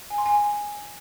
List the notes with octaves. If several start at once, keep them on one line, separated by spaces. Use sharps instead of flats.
G#5
C6
G#5